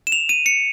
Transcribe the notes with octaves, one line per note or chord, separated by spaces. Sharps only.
E7
F7
D#7
C#7